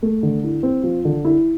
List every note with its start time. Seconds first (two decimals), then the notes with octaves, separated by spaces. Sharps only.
0.03 A3
0.23 D3
0.44 E4
0.63 C4
0.84 F3
1.05 D3
1.25 E4